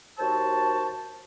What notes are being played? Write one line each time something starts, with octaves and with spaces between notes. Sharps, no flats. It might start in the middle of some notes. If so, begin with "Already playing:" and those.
D#2 F#4 C5 A5